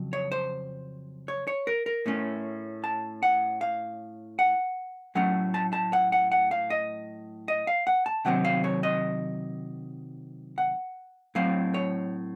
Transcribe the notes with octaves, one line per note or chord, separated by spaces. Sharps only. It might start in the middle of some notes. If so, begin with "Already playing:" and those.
Already playing: F2 C#3 F#3
C#5
C5
C#5
C#5
A#4
A#4
A2 A3 C#4
A5
F#5
F5
F#5
A2 F#3 A3 C#4 F#5
A5
A5
F#5
F#5
F#5
F5
D#5
D#5
F5
F#5
A5
C3 D#3 F#3 C4 F#5
F5
C#5
D#5
F#5
A2 F#3 C4 F5
C#5